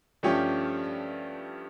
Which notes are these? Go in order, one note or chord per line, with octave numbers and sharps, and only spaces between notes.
G2 F3 A3 C#4 G4